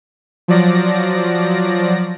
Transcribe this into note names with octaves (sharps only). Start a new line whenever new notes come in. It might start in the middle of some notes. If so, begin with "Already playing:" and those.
F3 F#3 D5 A#6